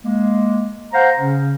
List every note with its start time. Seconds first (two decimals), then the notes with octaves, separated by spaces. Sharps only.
0.04 G#3 A#3
0.93 C5 F5 F#5 A#5
1.17 C#3 C#4